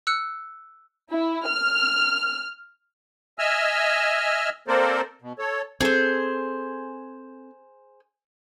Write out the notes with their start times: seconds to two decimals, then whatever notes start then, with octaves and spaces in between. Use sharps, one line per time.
0.07 E6 F#6 C#7
1.11 E4
1.46 F6
3.39 D#5 E5 G#5 E6 F6
4.68 A#3 C4 A4 A#4 C5 D5
5.22 B2
5.39 A4 C#5
5.81 C4 G#4 A4 C5